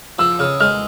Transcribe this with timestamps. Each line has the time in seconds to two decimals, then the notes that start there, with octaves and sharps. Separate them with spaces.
0.19 F3 E6
0.39 C#3 F6
0.60 G#3 F6